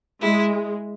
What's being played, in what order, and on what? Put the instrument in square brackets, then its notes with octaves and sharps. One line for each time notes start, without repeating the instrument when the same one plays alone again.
[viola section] G#3 [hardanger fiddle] E4